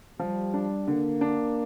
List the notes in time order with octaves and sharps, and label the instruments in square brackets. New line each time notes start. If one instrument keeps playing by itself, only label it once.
[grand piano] F3 [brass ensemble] G3
[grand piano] D4
[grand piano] D3 [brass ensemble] A#3
[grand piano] D4